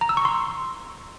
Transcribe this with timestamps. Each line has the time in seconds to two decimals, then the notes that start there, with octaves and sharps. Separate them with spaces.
0.01 A#5
0.09 E6
0.17 C#6
0.25 C6